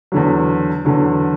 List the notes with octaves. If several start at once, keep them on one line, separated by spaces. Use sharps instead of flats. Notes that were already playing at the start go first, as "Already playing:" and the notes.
E2 D3 F#3
E2 D3 F#3